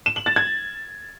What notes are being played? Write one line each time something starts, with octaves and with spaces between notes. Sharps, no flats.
E7
F#7
A6
G#6